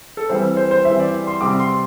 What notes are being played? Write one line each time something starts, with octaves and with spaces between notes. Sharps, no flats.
A4
E3 G3 C4 C5
C5
C5
E3 G3 C4 E5
D5
C6
C3 G3 C4 D6
C6